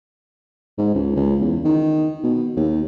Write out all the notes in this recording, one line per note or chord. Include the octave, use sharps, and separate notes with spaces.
G#2
C#2
C#2
E2
D#3
B2
D#2